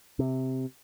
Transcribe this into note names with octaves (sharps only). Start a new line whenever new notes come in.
C3